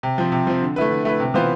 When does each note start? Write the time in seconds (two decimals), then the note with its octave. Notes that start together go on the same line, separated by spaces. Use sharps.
0.03 C3
0.18 F3 C4
0.32 C3
0.47 F3 C4
0.61 D3
0.76 A3 E4 B4
0.90 D3
1.05 A3 E4 B4
1.20 C3
1.34 E3 B3 F4 C5